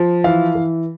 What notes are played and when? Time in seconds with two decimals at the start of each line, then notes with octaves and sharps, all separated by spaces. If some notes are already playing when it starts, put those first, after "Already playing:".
Already playing: F3
0.24 E3 F5
0.55 E3